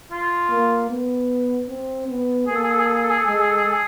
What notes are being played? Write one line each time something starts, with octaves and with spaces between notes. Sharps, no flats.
F4
A#3
B3
C4
B3
A#3 G#4
A4
G#4
A4
G#4
A4
G#4
A4
G#4
A4
G#3 G#4
A4
G#4
A4
G#4
A4
G#4